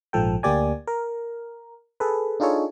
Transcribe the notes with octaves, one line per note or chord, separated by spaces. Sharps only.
A#1 G#2 F3 A4 G5
D2 A#3 G4 D5 G#5
A#4
G#4 A4 B4
D4 D#4 F4 G#4 A4 C#5